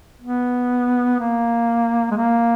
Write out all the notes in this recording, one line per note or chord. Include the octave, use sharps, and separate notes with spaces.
B3
A#3
G#3
A#3